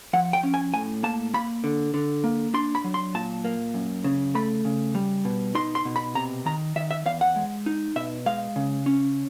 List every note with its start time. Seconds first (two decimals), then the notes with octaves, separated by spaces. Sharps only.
0.13 F3 F#5
0.33 G5
0.43 C#4
0.54 G#5
0.73 A2 G#5
1.03 A#3 A5
1.34 A#3 B5
1.64 D3
1.94 D3
2.24 A#3
2.54 D4 C6
2.75 B5
2.84 F#3
2.94 C6
3.15 A#2 A5
3.44 A#3
3.74 F#2
4.04 C#3
4.35 A3 B5
4.65 C#3
4.95 G3
5.25 B2
5.55 D#4 C6
5.75 C6
5.85 B2
5.96 B5
6.15 C3 A#5
6.46 D#3 A#5
6.76 D#3 E5
6.91 E5
7.06 E2 F5
7.21 F#5
7.36 G#3
7.66 D#4
7.96 B2 E5
8.26 G#3 F5
8.56 C#3
8.86 C#4